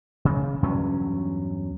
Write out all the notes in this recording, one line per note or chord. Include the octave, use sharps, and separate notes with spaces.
C#3
E2 G2 F#3 C#4